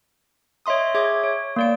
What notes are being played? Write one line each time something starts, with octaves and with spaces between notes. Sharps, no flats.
C#5 D#5 E5 C6 D#6
G#4 C#5 E5 D6 G#6
C#5
A#3 D5 D7